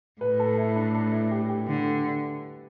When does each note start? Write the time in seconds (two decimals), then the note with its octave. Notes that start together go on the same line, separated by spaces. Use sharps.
0.21 A2 B4
0.40 A4
0.58 E4
0.76 D4
0.95 D4
1.12 E4
1.31 G4
1.49 G4
1.68 D3